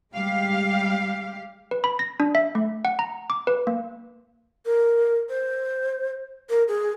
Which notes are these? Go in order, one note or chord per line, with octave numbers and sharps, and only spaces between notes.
G3 G#3 G4 F5
B4
B5
A#6
D4
E5
A3
F#5
A#5
D6
B4
A#3
A#4
C5
A#4
G#4